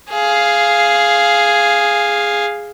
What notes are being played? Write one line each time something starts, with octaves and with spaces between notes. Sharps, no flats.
G#4 F5